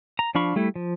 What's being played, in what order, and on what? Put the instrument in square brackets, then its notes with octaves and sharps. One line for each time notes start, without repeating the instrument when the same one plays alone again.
[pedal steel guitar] A#5
F3 D4 F5 B5 C#6
G3 A3 E4
F3